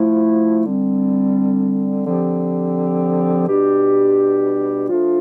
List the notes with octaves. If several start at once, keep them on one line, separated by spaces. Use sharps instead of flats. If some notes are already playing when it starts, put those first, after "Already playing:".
Already playing: F3 A3 E4
D3 G3 C4
D3 F3 C4 G4
B2 G3 D4 G4
F3 A3 D4 F4